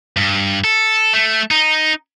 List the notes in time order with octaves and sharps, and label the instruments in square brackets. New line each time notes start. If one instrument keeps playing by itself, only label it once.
[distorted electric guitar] G2
A4
A3
D#4